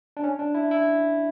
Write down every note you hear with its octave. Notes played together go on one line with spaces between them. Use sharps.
D4
C#4
D4
E4
E4